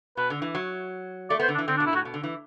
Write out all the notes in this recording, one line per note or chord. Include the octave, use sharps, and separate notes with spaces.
B2 B4
D3
E3
F#3
A3 D5
B3 C5
D3
D4
E3
D3 C4
D4
B2
E4
A2 F#4
B2
D3
E3